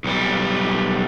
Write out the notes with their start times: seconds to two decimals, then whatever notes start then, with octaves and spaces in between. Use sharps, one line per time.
0.04 B1 G3